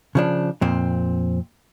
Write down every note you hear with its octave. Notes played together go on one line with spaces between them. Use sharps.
C#3 F3 D4
F2 A#2 C4